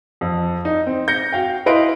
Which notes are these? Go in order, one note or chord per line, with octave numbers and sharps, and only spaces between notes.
F2
D#4
C4
G6 A#6 C#7
F#4 F5 G5
E4 B4 D#5 F5 C6 D7